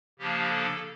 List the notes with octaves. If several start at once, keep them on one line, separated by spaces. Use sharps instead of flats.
C#3 F3 A#3 D4 G4
A4